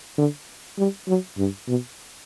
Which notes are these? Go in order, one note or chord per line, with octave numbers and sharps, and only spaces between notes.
D3
G3
F#3
G2
B2